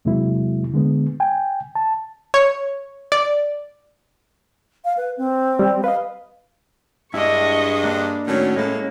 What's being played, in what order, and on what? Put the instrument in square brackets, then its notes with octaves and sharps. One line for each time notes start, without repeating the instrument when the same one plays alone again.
[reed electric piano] E2 C3 F#3 G#3 A#3 E4
D3 G#3 B3
G5 G#5
A5
[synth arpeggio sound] C#5
D5
[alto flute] F5
B4
C4
[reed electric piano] G3
[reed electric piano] B4 D#5 [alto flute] F5
[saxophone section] G2 G#3 [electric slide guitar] E4 D5 [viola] D#5 C#6
[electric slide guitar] A#3 D4
[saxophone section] A2 D#3 F#3 [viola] C#4
[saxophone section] A2 [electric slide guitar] G#3 A#3